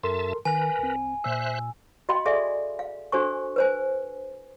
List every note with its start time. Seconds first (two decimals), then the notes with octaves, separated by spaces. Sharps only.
0.03 F#2 A4 A#4 E5 A5 C6
0.45 D#3 A#4 B4 G#5
0.79 C2 C4
1.24 A#2 C5 E5 E6 F#6
2.09 F#4 D#5 F5 G5 B5 C6
2.25 G#4 A4 D5 E5 F5 G#5
2.79 F5
3.12 D4 F#4 A4 C5 G#5 C#6
3.56 B4 C5 G#5